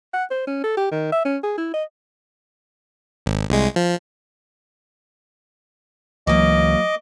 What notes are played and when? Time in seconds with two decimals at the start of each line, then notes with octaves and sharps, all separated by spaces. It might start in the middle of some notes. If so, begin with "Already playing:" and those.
0.14 F#5
0.31 C5
0.47 C#4
0.64 A4
0.77 G4
0.91 D#3
1.12 E5
1.25 C#4
1.44 G#4
1.58 E4
1.74 D#5
3.26 G#1
3.50 C2 G#3
3.76 F3
6.27 C#2 E3 F#3 A#3 D#5 D6